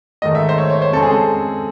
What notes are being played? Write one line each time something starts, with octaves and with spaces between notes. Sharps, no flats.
G#2 D#3 A3 D#5
E5
C5
C#5
C#5
C5
C#3 G#3 C4 A4
G#4
A4